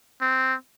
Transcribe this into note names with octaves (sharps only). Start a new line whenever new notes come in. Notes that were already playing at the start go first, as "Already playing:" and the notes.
C4